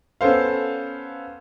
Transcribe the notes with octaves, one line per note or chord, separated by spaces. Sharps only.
B3 C#4 A4 C5 F5